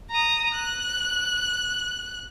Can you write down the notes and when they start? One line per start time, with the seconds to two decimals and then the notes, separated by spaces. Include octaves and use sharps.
0.11 A#5 D#6
0.55 F#6